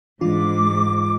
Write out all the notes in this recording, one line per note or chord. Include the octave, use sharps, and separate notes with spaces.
G#2 E3 D4 F4 D6